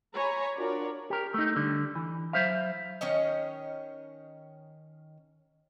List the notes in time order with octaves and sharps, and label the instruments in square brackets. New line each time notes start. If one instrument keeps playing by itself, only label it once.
[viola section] C#5 G#5 A#5 B5
D4 F4 F#4 A#4 C#5 D5
[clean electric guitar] G4 A#4
A3 D#4
D3 G3
E3
F#3 C5 E5 F5
[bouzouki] D#3 C#4 C#5 D#5